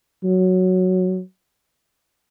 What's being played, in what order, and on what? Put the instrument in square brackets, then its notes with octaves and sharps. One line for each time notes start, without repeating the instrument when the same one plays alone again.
[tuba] F#3